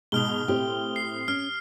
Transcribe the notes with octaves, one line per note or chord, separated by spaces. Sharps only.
G#2 B2 D#6 F6 G7
A2 C4 G4
C7
C#4 F6